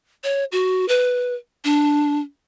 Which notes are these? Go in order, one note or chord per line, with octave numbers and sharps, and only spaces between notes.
C#5
F#4
B4
D4